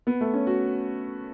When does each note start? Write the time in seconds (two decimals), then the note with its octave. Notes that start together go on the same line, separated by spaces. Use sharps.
0.07 B3
0.21 A3
0.34 C#4
0.47 F#4